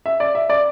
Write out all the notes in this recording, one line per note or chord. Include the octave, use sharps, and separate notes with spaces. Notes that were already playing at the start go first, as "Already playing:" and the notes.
E5
D5
E5
D5